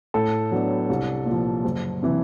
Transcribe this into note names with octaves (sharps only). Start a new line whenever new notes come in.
A2 A4
F#3 B3 D4
C2
A#2
F3
F#1
C3 E3